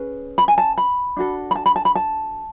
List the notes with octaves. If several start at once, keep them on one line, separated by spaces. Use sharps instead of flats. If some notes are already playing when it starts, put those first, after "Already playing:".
Already playing: C#4 G#4 B4
B5
G#5
A5
B5
D4 F#4 A4
B5
A5
B5
A5
B5
A5